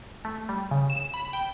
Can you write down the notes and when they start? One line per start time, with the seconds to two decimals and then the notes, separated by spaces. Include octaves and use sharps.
0.25 A3
0.49 G3
0.71 C#3
0.90 E7
1.14 B5
1.33 G5